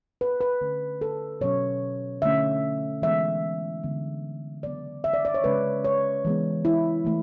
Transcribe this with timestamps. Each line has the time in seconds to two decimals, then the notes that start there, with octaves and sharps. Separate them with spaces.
0.21 B4
0.41 B4
0.61 D3 A3 C#4
1.01 A4
1.41 B2 F#3 C#4 C#5
2.22 D3 A3 C#4 E5
3.02 E3 G#3 B3 E5
3.83 D3 G#3 B3
4.63 C#3 F#3 B3 D5
5.04 E5
5.14 D5
5.25 D5
5.34 C#5
5.44 C#3 G#3 C#4 B4
5.85 C#5
6.25 E3 G#3 B3
6.65 E4
7.05 E3 A3